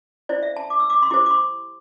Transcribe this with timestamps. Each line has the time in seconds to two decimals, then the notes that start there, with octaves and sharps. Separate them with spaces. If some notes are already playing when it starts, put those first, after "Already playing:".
0.29 E4 C5 D5
0.43 E5
0.56 A5
0.70 D6
0.79 E6
0.90 D6
1.03 C6
1.10 E4 G4 C5 D6
1.26 D6
1.31 C6